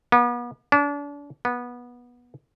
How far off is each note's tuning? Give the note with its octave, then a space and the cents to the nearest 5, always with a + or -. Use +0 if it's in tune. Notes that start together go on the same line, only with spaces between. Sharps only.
B3 -40
D4 -35
B3 -20